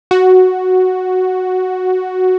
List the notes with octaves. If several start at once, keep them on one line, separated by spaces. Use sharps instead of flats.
F#4